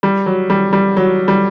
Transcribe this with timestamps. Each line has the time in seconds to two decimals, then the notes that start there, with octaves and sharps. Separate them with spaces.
0.03 G3
0.26 F#3
0.50 G3
0.73 G3
0.97 F#3
1.28 G3